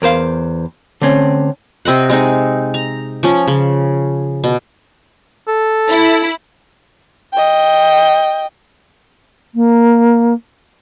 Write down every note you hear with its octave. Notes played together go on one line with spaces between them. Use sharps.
E2 A#4 C5 F5
D3 A3 C4 C#4
C3 C4 D#5 F#5
G#3 C4 D#4
A#5
F3 C#4
C#3
B2
A4
E4
D#5 G5
A#3